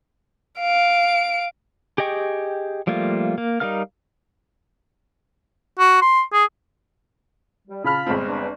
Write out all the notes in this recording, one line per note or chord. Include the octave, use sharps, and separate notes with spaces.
F5 D7
G4 G#4 D#5 G5 C#6
F3 G3 A3 A#3 F4
A#3
G3 D#4 A#4 F5 F6
F#4
C6
G#4
G3
C#3 F4 A5 B5 F6
G1 G#3 C4
D4 B4